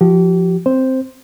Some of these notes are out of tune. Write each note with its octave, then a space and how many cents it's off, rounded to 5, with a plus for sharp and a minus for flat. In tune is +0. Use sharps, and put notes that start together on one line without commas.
F3 +0 G4 -35
C4 +0 C5 +0